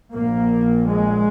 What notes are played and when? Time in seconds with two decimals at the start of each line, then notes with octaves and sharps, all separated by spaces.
0.13 A#1 A#2 A#3
0.87 G#3